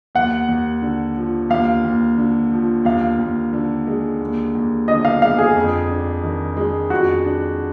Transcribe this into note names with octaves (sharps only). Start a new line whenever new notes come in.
D#2 F#5
D#2
D3
F3
D#2 F5
D#2
D3
F3
D#2 F5
D#2
D3
G#3
D#2
D#2
D3 D#5
F5
G#3 F5
G#4
F2
D4
D#3
G#3
F2 F#4
D4